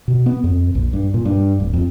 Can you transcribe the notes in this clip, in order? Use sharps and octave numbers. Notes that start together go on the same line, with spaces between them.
B2
B3
F2
A#1
G2
A#2
G2
D1
F2